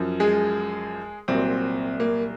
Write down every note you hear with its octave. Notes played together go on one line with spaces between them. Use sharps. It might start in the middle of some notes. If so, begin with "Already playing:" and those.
Already playing: F#2 F3
G#3 G#4
C2 A#2 F#3 C4
A#3